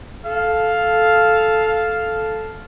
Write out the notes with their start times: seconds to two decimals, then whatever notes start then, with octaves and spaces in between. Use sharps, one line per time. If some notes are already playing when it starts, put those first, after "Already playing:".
0.25 A4 F5